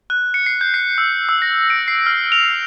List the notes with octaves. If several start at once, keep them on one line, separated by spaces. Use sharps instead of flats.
F#6
C#7
C7
G6
C7
E6
E6
A#6
D7
C7
F6
F7